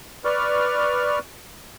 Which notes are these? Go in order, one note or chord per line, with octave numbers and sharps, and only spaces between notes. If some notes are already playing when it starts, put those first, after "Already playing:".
B4 D5 C#6 F6